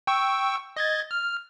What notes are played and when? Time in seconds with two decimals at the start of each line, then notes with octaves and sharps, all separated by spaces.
0.07 G5 C#6 E6
0.77 D#5 G#6 A6
1.11 F6